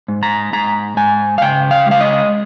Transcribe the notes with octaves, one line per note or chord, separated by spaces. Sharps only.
G#2
A#5
G#2 A#5
G#2 G#5
F5
C#3 G5
F5
G#3
F5
D#5